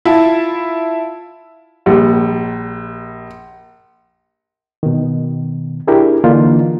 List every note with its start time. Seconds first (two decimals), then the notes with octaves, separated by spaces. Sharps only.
0.05 E4 F4 E5 A5
1.86 A#1 G3
4.83 B2 D#3
5.87 D4 E4 G4 G#4 A#4
6.24 D3 E3 A#3 D4 D#4 F4